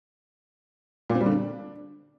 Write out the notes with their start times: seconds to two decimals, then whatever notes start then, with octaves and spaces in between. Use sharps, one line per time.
1.10 A#2
1.15 C4
1.21 G3
1.26 D3
1.32 D4